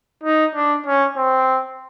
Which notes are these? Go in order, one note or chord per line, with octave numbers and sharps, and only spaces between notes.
D#4
D4
C#4
C4